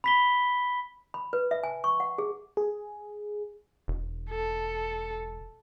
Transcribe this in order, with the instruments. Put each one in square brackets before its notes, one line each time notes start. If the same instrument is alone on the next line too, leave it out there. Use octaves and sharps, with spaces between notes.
[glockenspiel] B5 B6 G7
[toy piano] B5
B4
E5
G#5
C#6
F#5
G#4
[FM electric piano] G#4
[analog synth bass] E1
[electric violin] A4